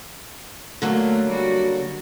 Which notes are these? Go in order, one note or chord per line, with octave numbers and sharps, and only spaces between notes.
D3 F#3 A3 A#3
G3 F#4